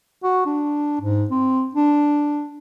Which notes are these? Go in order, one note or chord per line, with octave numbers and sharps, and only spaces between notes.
F#4
D4
G#2
C4
D4